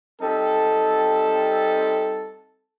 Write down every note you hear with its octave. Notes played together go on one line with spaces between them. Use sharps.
G3 C4 D#4 A4